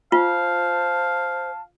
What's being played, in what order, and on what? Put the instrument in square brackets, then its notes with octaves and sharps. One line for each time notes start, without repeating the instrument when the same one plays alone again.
[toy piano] F4 [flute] C5 [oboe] F5 [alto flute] A5